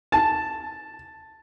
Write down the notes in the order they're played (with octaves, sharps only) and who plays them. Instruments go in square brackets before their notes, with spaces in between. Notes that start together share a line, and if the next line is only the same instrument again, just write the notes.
[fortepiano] A5